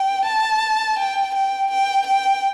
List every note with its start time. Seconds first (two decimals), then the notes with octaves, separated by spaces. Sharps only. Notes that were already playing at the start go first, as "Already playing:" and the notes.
Already playing: G5
0.27 A5
0.99 G5
1.35 G5
1.71 G5
2.07 G5